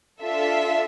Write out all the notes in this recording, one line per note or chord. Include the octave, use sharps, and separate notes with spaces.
D4 F4 A4 E5